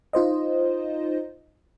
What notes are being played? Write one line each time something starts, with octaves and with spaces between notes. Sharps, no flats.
D#4 F4 C5 D#5